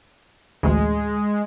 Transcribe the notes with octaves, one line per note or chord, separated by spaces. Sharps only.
A1 D2 G#3